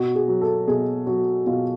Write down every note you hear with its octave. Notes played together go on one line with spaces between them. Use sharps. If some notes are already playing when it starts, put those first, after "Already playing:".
Already playing: B2 F#4
G#4
F#3
A4
B2 G#4
F#3 F#4
B2 F4